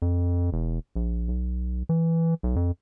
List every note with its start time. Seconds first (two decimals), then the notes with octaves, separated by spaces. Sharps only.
0.02 F2
0.52 E1
0.96 A#1
1.28 B1
1.89 E3
2.43 B1
2.56 F2